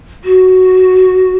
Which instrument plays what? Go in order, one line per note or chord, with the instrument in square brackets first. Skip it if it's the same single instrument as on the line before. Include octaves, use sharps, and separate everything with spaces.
[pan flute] F#4